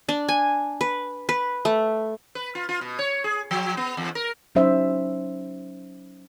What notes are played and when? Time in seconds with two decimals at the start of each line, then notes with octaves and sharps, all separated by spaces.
0.09 D4
0.28 G#5
0.81 B4
1.29 B4
1.65 A3
2.35 B4
2.55 F4
2.69 F4
2.81 B2
2.99 C#5
3.24 G#4
3.51 F3
3.77 B3
3.97 E2
4.15 A#4
4.55 F#3 C#4 D#4 C5 E5